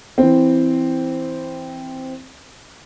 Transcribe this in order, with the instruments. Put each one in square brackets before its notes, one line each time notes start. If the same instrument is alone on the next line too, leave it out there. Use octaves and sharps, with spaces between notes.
[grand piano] E3 C4